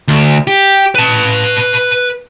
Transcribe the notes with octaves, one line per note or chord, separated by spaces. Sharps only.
D2
G4
B4 A5